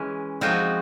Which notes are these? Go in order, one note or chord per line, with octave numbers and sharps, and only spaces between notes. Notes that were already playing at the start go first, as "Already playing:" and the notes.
Already playing: E3 G#3 C#4
F3 G#3 C4 D#4 F#4